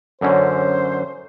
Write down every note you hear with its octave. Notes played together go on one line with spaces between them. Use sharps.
F#2 D3 C#4 C5